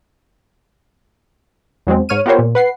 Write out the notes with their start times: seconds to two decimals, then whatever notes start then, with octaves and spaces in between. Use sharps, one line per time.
1.87 E2 F#3 G#3 C4
2.09 G#2 C#5 F6 D#7
2.26 B3 F4 G4 A#4 C5 C#5
2.39 A#2
2.55 B4 F#5 C7